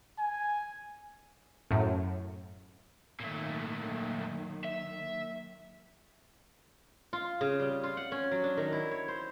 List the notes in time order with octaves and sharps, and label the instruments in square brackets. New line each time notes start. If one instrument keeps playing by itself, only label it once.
[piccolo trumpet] G#5
[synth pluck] F#2 A2
[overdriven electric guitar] A#2 A3 [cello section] D#3 F#3 A#3
[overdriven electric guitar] E5
[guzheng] F4
C#3
G3
F4
F#5
C#4
F#3
D4
D#3
E4
C#5
C5